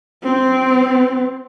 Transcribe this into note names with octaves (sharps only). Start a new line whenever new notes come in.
C4